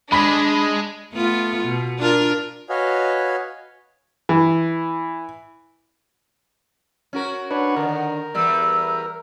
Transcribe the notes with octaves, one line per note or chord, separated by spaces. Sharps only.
G#3 D4 G#4 B5 B6
A3 B3 F4
B2
D4 F4 A#4
F#4 B4 C#5 D#5 F5 G#5
E3
C#4 F#4 A#4
D4 B4 C#5 F#5
D3 D#3 A#4
E2 G3 B3 E6